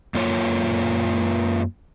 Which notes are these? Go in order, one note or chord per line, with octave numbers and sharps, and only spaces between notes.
F#2 A#3 F4 C#5